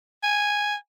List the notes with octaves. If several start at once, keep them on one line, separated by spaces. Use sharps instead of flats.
G#5